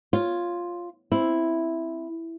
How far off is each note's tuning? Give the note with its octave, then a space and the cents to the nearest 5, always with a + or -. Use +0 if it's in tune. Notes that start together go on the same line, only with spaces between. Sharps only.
F4 +0 C#5 +0
C4 +0 E4 +0